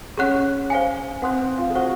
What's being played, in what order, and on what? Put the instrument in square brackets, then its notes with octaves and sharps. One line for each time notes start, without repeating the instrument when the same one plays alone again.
[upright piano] C#4 [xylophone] G#4 C#5 F#5 C#6 F#6
[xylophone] C5 F5 G#5
[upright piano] C4 [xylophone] F#5 C6 D#6 F#6
[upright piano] F4
G#4
[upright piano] F#4 [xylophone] C5 F#5 C#6 F#6